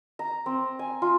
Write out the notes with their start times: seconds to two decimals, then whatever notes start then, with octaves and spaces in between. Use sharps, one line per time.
0.19 A#5
0.46 C4
0.79 G#5
1.02 F4